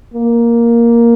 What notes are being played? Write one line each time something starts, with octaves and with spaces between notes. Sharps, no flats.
A#3